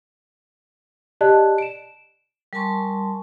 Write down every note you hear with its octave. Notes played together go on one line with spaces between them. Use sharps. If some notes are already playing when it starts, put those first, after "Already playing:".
G4 D5 D#5 A5 F#6
D7 E7
G3 A#4 G#5 A5 C6 C#6